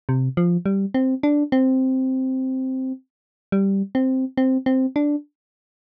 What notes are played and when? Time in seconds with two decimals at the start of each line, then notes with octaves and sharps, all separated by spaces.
0.09 C3
0.37 F3
0.66 G3
0.94 C4
1.23 D4
1.52 C4
3.52 G3
3.95 C4
4.37 C4
4.66 C4
4.96 D4